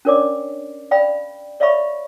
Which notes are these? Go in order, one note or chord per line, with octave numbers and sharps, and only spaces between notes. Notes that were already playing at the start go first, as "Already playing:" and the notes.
C#4 D4 A#4 C#5 D5 D6
D5 F5 G5 B5
C#5 D5 E5 F5 B5 C#6